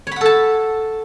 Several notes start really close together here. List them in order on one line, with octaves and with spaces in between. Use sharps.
C#5 B5 F#5 A4 A5